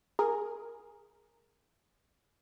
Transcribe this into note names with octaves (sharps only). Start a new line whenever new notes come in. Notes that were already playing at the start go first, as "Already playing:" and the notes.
G#4 A#4